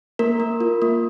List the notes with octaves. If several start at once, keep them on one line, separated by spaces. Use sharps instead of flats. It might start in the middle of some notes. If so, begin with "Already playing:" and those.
A#3 A#4
A#3
F4
A#3